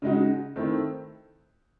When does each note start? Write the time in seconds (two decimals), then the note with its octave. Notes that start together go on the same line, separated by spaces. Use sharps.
0.02 C#3 G#3 D#4 F#4
0.56 D#3 A3 C4 E4